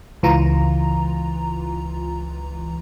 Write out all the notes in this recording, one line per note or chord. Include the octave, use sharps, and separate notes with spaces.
C#2 E3 F4 A#5